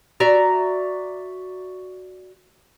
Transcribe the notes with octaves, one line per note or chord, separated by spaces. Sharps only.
F#4 D5 E5 A#5